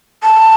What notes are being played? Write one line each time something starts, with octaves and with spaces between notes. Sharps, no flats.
A5